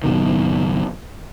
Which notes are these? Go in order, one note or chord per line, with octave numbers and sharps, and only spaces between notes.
F#1 C#2 B2 D#3